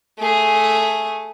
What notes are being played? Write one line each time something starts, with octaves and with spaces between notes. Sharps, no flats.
A3 G#4